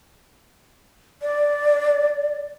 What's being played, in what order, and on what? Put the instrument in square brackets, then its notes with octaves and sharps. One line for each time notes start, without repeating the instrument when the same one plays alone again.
[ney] D5